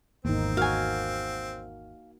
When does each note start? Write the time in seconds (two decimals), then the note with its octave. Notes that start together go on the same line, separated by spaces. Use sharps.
0.25 G#1 E2 A#3 C4 D#4
0.57 F#4 A#4 F5 G#5